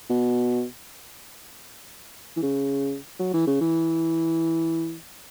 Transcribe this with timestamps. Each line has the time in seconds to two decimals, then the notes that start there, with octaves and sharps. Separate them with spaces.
0.10 B2
2.37 E3
2.42 C#3
3.19 F#3
3.34 E3
3.47 C#3
3.61 E3